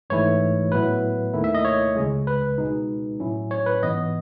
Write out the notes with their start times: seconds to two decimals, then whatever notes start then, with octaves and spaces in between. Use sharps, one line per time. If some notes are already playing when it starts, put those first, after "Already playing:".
0.10 G#1 G#2 E3 A3 E4 C#5
0.72 A2 F#3 B3 E4 B4
1.33 D#2 D#3 A3 E4
1.44 E5
1.55 D#5
1.65 C#5
1.96 C#2 C#3 G#3
2.27 B4
2.58 B2 G#3 D#4
3.20 A2 F#3 C#4 E4
3.51 C#5
3.66 B4
3.82 G#2 E3 B3 D#5